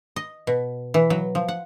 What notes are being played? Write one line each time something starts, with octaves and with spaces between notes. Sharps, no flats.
D#5
B2
E3
F#3
F3
F#5